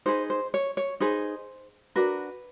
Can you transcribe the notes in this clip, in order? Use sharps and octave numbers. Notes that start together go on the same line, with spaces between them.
D#4 G#4 B4 C5
C5
C#5
C#5
D#4 G#4 B4 C5
D4 F#4 A#4 B4